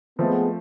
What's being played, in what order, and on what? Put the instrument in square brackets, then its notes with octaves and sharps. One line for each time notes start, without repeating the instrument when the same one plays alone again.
[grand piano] F3 A3 C4 [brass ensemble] G#3 B3